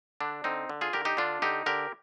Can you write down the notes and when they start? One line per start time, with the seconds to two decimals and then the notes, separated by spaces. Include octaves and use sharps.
0.20 D3 D4
0.44 D3 C4 D#4
0.69 D3
0.81 F4 G#4
0.93 D3 G4 A#4
1.05 D#4 G4
1.17 D3 D4 F4
1.42 D3 D#4 G4
1.66 D3 G4 A#4